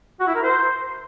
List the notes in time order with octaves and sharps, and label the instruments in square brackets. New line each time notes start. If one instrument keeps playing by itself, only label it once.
[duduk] F#4
E4
A#4
C5